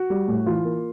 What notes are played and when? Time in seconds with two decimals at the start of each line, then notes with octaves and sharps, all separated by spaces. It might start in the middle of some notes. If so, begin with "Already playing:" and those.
Already playing: F#4
0.10 G3
0.28 A2
0.46 E3 F4
0.65 A#3